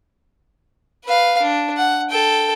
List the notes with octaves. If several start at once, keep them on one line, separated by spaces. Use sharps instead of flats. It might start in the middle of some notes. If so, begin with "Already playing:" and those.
B4 F5
D4
F#5
A4 G5